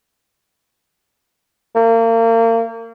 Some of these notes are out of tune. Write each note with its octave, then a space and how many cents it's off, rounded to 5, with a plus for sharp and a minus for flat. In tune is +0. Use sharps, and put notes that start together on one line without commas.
A#3 -35